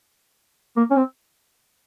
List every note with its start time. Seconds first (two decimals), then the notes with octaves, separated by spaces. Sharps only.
0.77 A#3
0.91 C#4
0.96 C4